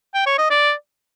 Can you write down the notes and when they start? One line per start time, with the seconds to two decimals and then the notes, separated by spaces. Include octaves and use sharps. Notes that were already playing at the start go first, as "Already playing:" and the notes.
0.15 G5
0.27 C#5
0.38 D#5
0.50 D5